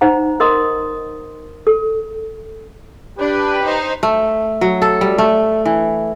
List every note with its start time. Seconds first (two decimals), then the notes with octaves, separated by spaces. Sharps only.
0.01 D#4 C5 F#5 A#5
0.40 A#4 D#5 C6 D#6
1.67 A4
3.18 D4 G4 B4
3.65 D#4 C5
4.03 A3
4.61 F#3
4.82 A4
5.01 G3
5.18 A3
5.66 E3